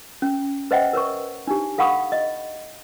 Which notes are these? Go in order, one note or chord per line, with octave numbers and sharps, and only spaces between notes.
C#4
B4 C5 D#5 E5 F#5 G5
A#4 B4 C#5 C#6
D4 D#4 G4
A4 F5 F#5 B5 C#6 D#6
D#5